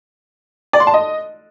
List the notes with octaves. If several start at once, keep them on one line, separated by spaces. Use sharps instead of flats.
D5
C6
A5
D#5